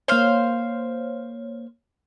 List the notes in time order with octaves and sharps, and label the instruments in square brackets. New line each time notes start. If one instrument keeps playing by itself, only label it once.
[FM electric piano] A#3 C#5 [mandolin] C5 F5